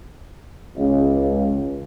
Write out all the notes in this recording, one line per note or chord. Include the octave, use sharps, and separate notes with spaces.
C#2